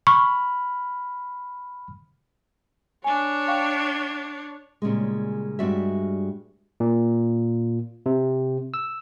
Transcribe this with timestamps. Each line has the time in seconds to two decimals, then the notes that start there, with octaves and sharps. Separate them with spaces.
0.07 B5 C#6 F6
3.04 D4 C#5 G#5
3.48 F5 G5 C#6
4.82 A#2 C#3 G3 G#3
5.59 G2 G3 G#3 F#4 D5 E5
6.80 A#2
8.06 C3
8.74 E6